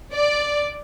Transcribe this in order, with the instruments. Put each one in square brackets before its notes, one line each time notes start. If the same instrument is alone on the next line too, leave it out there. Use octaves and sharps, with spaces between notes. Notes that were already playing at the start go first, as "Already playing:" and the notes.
[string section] D5